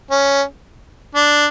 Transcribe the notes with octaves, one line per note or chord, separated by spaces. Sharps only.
C#4
D4